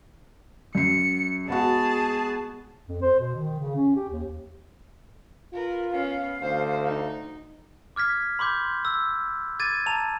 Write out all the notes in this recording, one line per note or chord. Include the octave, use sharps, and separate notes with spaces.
F#2 C7 C#7
G#3 B3 F#4 G#4 A5
F2
C5
B2
D#3
C#3
C#4
G4
D#2
F4 A#4 B4
B3 C#4 F5
D2 C5
D#4
D6 F6 G#6 B6
B5 C6 D6 G6
E6
D6 G#6 A6 D#7
A5 A#5 F7